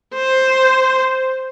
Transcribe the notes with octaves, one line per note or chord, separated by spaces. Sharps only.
C5